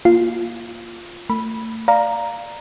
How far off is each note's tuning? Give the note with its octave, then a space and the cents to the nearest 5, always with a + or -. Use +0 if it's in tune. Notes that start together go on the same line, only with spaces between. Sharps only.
A#3 +10 F4 -5
A3 +30 B5 -10
D5 +10 F5 +0 A#5 +0